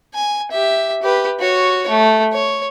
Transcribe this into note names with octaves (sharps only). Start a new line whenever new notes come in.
G#5
G4 E5
G4 B4
F#4 C#5
A3
C#5